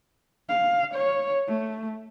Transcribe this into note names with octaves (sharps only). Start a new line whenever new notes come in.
F5
C#5
A3